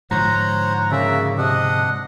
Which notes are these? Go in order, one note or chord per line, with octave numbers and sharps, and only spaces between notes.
G#2 D3 F3 C5 C#5 F#5 A#5
C#3 A#3 F#4 D5 E5
C3 D4 D#5 F#5